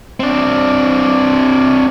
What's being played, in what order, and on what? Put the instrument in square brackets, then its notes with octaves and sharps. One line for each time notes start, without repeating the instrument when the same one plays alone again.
[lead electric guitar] C4 D4